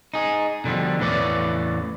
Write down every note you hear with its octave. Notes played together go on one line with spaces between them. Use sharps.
D#4 G#4
B2 D3 F3 G3
E2 A2 E3 B4 C#5 D5